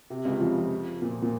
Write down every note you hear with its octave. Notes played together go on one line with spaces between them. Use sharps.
C3
C#2 C#3
F2 F3
A#2
A#2